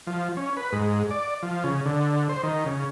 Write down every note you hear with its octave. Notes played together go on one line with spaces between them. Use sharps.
F3
C#4
B4
G#2
D5
F3
C#3
D3
C5
D#3
C#3